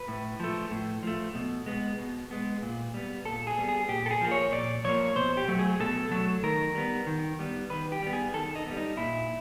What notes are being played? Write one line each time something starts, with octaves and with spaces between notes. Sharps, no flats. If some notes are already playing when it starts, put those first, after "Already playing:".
Already playing: B4
A2
F3 A3
A2
F3 A3
B2
G#3 B3
B2
G#3 B3
A#2
G3 B3
A#2 A4
G#4
G3 B3
G#4
A#2 G4
A4
G#4
F3 A#3
C#5
A#2 D5
F3 A#3 C#5
B2 C5
G4
F#3 A3
G#4
B2 A4
F#3 A3
D#3 A#4
G3 B3
D#3
G3 B3
D#3 B4
G4
G3 B3
G#4
D#3 A4
D#4
G3 B3
D#4
A#2 E4